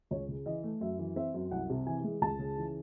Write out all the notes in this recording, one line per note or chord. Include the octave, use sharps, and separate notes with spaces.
C#2 C#5
C#3
E3 D#5
A3
F#2 E5
E3
C4 E5
F#2
C2 F#5
C3
E3 G#5
G#3
C#2 A5
C#3
E3